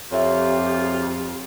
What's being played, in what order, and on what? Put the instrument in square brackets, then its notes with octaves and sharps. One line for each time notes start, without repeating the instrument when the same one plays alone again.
[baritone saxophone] F2 [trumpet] F4 [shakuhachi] G4 [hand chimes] C#5 E5